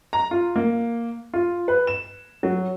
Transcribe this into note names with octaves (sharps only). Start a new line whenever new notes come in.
A#5
F4
A#3
F4
B4
E7
F#3